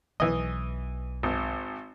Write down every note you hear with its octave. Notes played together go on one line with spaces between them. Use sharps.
B1 E3 D#5
G#1